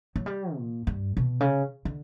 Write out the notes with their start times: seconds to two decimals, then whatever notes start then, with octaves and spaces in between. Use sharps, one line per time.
0.16 F#3
0.26 G3
0.56 A#2
0.87 G2
1.17 B2
1.40 C#3
1.85 D3